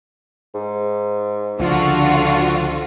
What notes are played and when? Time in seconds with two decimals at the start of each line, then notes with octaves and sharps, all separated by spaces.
0.55 G#2
1.60 C#2 D3 F3 F4 F#4
2.07 F2